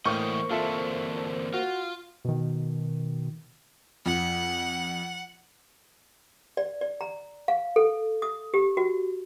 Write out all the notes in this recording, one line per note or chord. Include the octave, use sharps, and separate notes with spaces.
A2 D3 E3 A#3 A#4 C5 D#5 C#6
D3 E3 C4 F4 A4 E5
F4 F#4
B2 D#3
F2 F#5
D5
D5
A#5
F5
A4
D#6
G4
F#4